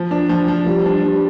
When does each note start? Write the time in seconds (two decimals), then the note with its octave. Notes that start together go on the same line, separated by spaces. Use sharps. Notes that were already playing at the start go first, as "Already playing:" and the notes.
Already playing: F3
0.11 D4
0.29 F3
0.48 F3
0.66 G3
0.86 D4
1.03 G3